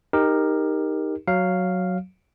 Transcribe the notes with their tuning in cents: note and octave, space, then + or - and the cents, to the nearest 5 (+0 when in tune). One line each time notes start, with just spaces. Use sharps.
D#4 +0 G4 +20 A#4 +0
F#3 +0 F5 +0